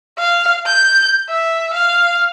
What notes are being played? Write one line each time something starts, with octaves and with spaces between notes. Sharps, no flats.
F5
G6
E5
F5